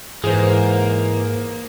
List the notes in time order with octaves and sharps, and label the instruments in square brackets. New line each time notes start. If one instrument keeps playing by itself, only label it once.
[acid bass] G#2 [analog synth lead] E3 [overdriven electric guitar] A#3 [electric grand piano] G#4 C5